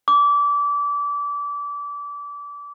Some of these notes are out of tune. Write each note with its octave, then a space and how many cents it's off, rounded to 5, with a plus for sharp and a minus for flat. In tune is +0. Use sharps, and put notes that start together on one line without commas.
D6 -25